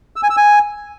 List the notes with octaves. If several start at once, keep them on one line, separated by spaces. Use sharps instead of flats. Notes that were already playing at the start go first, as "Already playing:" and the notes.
E6
G#5
E6
G#5